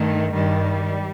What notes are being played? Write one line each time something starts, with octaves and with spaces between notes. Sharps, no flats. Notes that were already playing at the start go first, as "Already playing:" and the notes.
Already playing: G2 D#3 A3
G2 D#3 G3